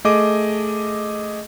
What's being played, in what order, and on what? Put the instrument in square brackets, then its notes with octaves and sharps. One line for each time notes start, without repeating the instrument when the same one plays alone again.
[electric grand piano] A3 G#4 D#5 D6